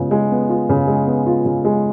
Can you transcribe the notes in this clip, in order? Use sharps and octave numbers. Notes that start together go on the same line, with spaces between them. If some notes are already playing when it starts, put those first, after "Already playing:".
Already playing: C#3 G#3 B3 F4
G#3
B3
F4
C#3
G#3
B3
F4
C#3
G#3